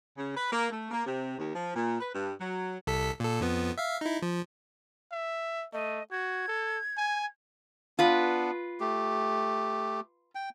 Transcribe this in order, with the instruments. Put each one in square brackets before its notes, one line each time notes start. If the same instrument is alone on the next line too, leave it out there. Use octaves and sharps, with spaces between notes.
[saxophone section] C#3
B4
A#3
A3
A#3
C3
D#2
F3
A#2
B4
G2
F#3
[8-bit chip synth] C2 A4 B6
A#2 A4
F2 F3 B3
E5 F5
D#4 E4
F3
[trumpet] E5
[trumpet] A3 [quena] D#5
[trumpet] F#4 [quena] G#6
[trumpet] A4
G#5
[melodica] B3 D4 [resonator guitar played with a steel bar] F4 B4
[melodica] A3 G4
G5